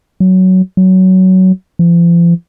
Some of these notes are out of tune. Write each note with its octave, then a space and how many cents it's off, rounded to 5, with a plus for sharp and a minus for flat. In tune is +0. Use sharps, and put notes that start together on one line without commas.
F#3 +10
F#3 +15
F3 -40